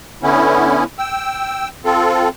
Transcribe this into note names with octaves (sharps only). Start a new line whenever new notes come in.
D3 B3 C#4 E4
G5 E6
C4 F4 A4